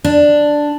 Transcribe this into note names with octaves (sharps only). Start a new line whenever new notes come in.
D4